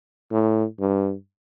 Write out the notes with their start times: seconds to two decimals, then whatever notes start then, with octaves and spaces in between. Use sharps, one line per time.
0.32 A2
0.80 G2